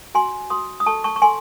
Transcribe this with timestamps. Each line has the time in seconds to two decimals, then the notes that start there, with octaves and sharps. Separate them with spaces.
0.15 F#4 G#5 C6
0.50 F#4 C6 D#6
0.80 D#6
0.86 A4 A5 C#6
1.04 A5 C#6
1.16 C#6
1.22 A4 G#5 C6